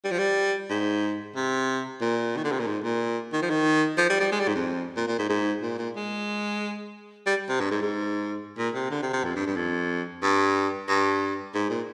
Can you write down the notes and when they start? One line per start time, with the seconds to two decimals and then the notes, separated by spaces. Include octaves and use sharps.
0.04 G3
0.11 F3
0.19 G3
0.70 G#2
1.36 C3
2.01 A#2
2.37 D#3
2.44 D3
2.52 C3
2.59 A#2
2.67 G#2
2.84 A#2
3.33 D#3
3.42 F3
3.50 D#3
3.98 F3
4.10 G3
4.20 G3
4.32 G#3
4.40 G3
4.48 G#2
4.55 F2
4.96 A#2
5.08 A#2
5.19 G#2
5.29 G#2
5.62 A#2
5.79 A#2
5.96 G#3
7.26 G3
7.49 C3
7.60 G2
7.71 G#2
7.82 G#2
8.58 A#2
8.75 C3
8.91 D3
9.02 C3
9.13 C3
9.24 F2
9.36 G2
9.47 G2
9.56 F2
10.23 G2
10.89 G2
11.54 G#2
11.70 A#2